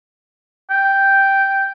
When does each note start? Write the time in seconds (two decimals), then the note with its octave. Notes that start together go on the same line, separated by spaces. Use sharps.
0.71 G5